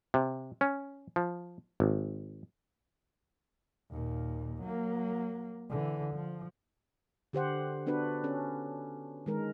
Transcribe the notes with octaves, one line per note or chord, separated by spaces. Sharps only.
C3
C#4
F3
G#1
D#2 A#2
F#3 A#3
D3 E3
F3
D3 G4 C5 F#5
B3 D4 F#4 B4
C#4 A4
D#3 G#3 A#4